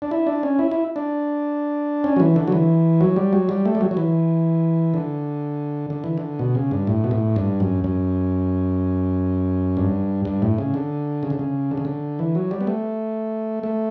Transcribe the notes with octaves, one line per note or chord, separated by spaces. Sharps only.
D4
E4
D4
C#4
E4
E4
D4
C#4
F#3
E3
D3
F#3
E3
F#3
G3
F#3
G3
A3
G3
F#3
F#3
E3
D3
D3
E3
D3
B2
C#3
G2
A2
B2
A2
G2
F#2
F#2
G2
G2
A2
C#3
D3
C#3
D3
C#3
D3
C#3
D3
E3
F#3
G3
B3
A3
A3